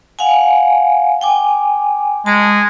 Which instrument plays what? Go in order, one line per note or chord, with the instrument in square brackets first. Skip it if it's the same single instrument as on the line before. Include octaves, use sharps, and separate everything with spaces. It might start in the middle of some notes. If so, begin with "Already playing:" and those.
[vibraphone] F5 F#5 G#5
G5 G#5 D6
[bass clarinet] G#3 [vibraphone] A5